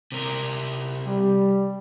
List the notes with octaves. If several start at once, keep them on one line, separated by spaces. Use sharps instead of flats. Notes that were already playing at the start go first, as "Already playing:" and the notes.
C3 A#4
G3